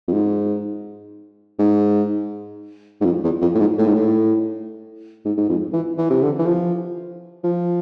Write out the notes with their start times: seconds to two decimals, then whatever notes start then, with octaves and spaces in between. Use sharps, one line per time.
0.08 F2
0.13 G#2
1.59 G#2
3.01 G#2
3.05 F2
3.24 E2
3.42 F2
3.55 A2
3.60 G#2
3.78 A2
3.86 G#2
3.94 A2
5.25 G#2
5.37 G#2
5.49 F2
5.73 E3
5.98 E3
6.10 C3
6.22 D3
6.39 E3
6.46 F3
7.44 F3